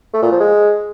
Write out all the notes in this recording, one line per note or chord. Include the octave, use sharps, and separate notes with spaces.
A3
A#2
F3
G#3